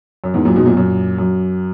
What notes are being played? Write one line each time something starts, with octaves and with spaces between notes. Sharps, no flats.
F#2
E2 G#2
F#2 A#2
G#2 B2
F#2 A#2
F#2 A#2
F#2